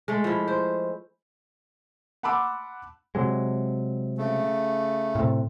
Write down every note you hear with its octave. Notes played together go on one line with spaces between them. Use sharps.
G#3 A3
F3 E4
C5
F#5 A5 B5 C6 D6 E6
C3 F#3 G#3
C#3 A3
A2 C3